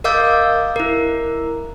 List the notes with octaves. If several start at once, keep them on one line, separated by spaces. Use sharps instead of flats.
A#4 D#5 F5 D6 E6 G6
E4 A#4